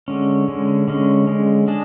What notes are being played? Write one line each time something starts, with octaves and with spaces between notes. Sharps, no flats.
D3 G#3 C#4
D3 G#3 C#4
D3 G#3 C#4
D3 G#3 C#4
G#3 D4 G#4